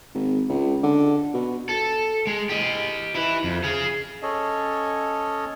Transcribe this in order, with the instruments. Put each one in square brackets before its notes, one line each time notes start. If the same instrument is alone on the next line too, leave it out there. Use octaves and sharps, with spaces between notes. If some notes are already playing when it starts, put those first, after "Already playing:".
[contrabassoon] G#1
C#2
D3
B2
[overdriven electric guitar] A4
G#3
G4 D#5
E4 B4
F2
G#4 F5
[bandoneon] C#4 A4 C#5 D#5